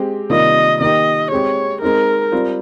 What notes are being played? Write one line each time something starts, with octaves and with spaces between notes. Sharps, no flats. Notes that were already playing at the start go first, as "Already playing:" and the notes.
Already playing: G#3 C4 G4
C3 D#3 G3 A#3 F4 D#5
D#3 A#3 D#4 G4 D#5
G#3 C4 G4 C#5
G#3 C4 D#4 A#4
G3 C4 F4